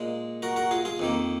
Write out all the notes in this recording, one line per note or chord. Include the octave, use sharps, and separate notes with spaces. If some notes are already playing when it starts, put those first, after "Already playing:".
Already playing: A#2 G#3
F#4 A#4
F#4 A#4
F4 G#4
F4 G#4
F2 D#3 A#3